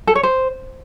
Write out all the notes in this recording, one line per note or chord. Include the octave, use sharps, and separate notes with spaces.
A4
C#5
C5